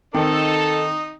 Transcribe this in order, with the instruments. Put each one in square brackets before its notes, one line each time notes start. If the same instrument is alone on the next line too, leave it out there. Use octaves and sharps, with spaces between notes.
[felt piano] D#3 C4 [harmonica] D#4 D#6 [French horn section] A4